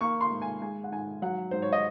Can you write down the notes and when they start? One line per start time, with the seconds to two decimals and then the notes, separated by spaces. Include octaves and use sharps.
0.01 A#3 C#6
0.21 C6
0.31 G#2
0.42 G#5
0.62 G#3 G#5
0.84 F#5
0.92 G#2 G#5
1.22 F#3 F#5
1.51 G#2 C5
1.62 C#5
1.73 D#5